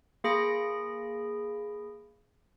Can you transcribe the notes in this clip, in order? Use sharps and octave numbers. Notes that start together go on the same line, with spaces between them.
A#3 G#4 B5 A#6 D7